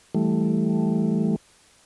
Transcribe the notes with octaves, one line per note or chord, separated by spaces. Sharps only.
E3 G3 A3